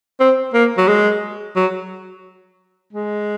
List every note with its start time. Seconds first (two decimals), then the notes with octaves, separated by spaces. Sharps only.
0.20 C4
0.54 A#3
0.78 F#3
0.88 G#3
1.56 F#3
2.93 G#3